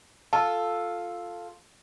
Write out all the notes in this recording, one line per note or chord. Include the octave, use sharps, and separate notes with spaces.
F4 A4 A5